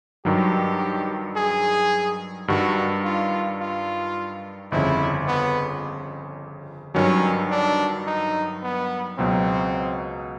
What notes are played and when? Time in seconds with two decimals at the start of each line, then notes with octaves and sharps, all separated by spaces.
0.25 G2 D#3 F#3 G4
1.36 G#4
2.48 G2 D#3 G3 F#4
3.04 F4
3.61 F4
4.72 G1 F2 C#3 E4
5.27 B3
6.95 G2 D#3 F#3 C#4
7.50 D4
8.07 D#4
8.63 B3
9.18 C#2 B2 F#3 C4